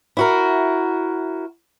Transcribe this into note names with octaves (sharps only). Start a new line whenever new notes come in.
E4 F#4 A#4